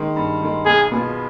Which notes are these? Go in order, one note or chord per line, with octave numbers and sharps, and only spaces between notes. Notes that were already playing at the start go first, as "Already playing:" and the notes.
Already playing: D#3 G#3
G2
D#3 G#3
B1 G#4
B2 B3 F4 G#4